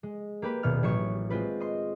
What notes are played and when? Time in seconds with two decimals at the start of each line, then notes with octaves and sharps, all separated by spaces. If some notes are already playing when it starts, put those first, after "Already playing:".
0.03 G#3
0.42 A#3 G4 B4
0.63 D#1 B2 B3 F6
0.83 A1 F#3 C#5 C#6 C#7 E7
1.30 G#3 C4 F4 B4
1.60 D#5 C6